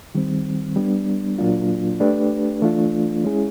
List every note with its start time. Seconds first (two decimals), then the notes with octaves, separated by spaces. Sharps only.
0.15 D#3 G3 C4
0.76 G3 B3 D4
1.38 A#2 F#3 A#3 D4 F4
2.00 A3 D4 G4 B4 D5
2.62 E3 A3 D4 F4
3.24 G#3 C#4 E4 G#4